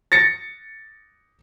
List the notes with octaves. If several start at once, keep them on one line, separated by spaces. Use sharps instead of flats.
A6 A#6 C#7